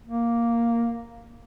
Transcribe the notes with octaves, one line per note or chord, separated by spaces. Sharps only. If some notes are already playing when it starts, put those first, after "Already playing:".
A#3